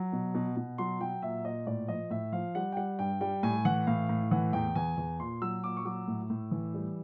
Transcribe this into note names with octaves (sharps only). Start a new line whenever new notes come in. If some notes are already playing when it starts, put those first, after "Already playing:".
Already playing: F#3
B2
B2
B2
F#3 C6
F#3 G5
A#2 E5
A#2 D#5
A2 D5
F3 D#5
A2 E5
F3 F5
G3 F#5
G5
G3 F#5
G2 G5
G3 G5
A2 G#5
E3 F#5
A2 F5
A2
E3 F#5
E2 G5
E2 G#5
E2
A#2 C6
F#3 E6
A#2 D6
C#6
F#3 D6
A2
A2
E3
G3